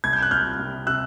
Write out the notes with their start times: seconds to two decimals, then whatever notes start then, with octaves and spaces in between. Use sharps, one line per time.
0.04 C2 G#6
0.13 G6
0.23 F#6
0.31 C2 F6 G6
0.59 C3
0.87 C3 E6 F#6